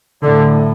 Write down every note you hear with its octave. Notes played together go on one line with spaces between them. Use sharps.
A2 D3